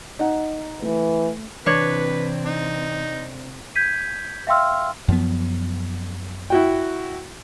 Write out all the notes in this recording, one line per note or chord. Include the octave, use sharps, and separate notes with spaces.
D#4 F#5
E3 A3
C3 E3 C4 D4 B4 C#5
D#4
G6 G#6 B6 D#7
E5 F5 G5 C6 E6 F6
F#2 F3 B3
E4 F#4 G5